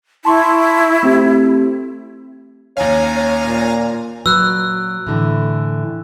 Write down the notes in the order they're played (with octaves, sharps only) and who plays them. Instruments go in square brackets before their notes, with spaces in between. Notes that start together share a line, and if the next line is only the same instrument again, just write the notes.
[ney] E4 [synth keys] A5 C6 C#6
[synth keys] A3 C4 G4
[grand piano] D#2 C#4 [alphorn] C#5 [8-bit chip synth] F5 G#5 A#5
[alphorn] C#5
A#2
[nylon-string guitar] A#2 F#3 B4 [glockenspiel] E6 F#6
[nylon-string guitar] A2 D3 E3